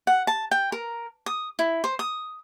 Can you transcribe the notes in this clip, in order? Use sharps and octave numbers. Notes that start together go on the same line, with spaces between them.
F#5
A5
G5
A#4
D#6
E4
C5
D#6